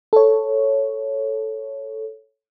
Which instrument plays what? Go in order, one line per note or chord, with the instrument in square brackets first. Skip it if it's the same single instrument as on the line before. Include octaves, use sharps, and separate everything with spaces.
[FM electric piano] A4 C#5